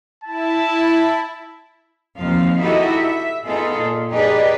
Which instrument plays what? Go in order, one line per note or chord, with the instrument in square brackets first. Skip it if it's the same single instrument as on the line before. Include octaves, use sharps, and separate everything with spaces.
[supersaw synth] E4 [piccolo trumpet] A5
[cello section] D#2 F3 C4 F5
D#4 E4 F#4 G4 A4 D#5
E5
B3 D#4 F4 G#4 A4
A#2
D#4 G4 G#4 B4 D5 D#5